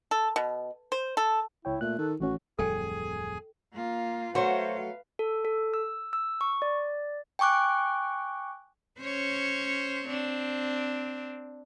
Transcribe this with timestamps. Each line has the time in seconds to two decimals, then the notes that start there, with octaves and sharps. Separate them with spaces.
0.11 A4
0.36 B2
0.92 C5
1.17 A4
1.65 C#2 E4 C#5 G5
1.81 A#2 A3 F#6
1.98 D#3 A4
2.20 A1 E3 C#4 F#4
2.59 D1 F2 G3 G#4 A4 G5 G#5
3.73 A#3 F4
4.35 F#3 A3 F#4 B4 C5 F5
5.19 A4
5.45 A4
5.74 E6
6.13 E6
6.41 C#6
6.62 D5
7.39 G5 G#5 C#6 D6 F#6
9.00 C#4 C5 C#5
10.07 C4 D4